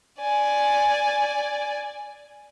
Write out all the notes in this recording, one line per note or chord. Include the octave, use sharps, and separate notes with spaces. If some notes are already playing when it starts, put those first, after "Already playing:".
D5 G#5